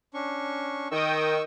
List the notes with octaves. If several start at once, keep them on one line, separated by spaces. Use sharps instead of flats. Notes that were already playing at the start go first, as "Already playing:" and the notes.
C#4 D4 C#6
D#3 D#5 G5 C#6 D#6 E6